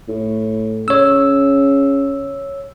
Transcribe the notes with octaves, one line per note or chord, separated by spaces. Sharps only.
A2
C#3 C#5 E6